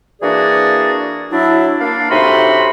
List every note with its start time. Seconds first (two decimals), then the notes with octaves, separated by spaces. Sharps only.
0.22 E3 A#3 D4 F#4 G#4 D5
1.32 F#3 D4 E4
1.80 A#3 D4 F5
2.10 A2 C3 D#4 F#4 B5 C6